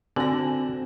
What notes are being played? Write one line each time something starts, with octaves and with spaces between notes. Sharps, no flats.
D3 C4 F#4 G#5 A#6 F#7